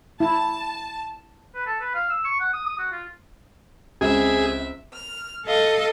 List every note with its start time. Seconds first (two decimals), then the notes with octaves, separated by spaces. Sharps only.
0.20 E4 A5
1.55 B4
1.66 A4
1.81 B4
1.95 F5
2.10 E6
2.25 C#6
2.40 F#5
2.53 D#6
2.66 D#6
2.79 F#4
2.92 F4
4.01 C#2 C4 G#4 E5
4.93 F6
5.46 A4 D#5 F5 D#6